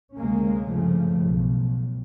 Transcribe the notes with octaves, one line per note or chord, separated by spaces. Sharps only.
D2 C3 G#3 A#3 C#4
G2 C#3 F3 A3
B1